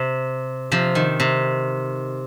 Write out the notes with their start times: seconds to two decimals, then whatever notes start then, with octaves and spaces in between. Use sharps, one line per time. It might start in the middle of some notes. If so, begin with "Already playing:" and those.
Already playing: C3
0.72 C3 F3
0.95 D#3
1.20 C3